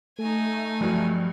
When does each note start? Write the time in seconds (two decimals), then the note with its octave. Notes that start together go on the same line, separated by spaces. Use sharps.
0.19 A3 D#4 G#5
0.81 G2 F3 F#3